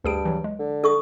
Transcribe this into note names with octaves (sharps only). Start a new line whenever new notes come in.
D2 G2 G#4 D7
E3 F#3
G#3
D3
A4 C#6 D#6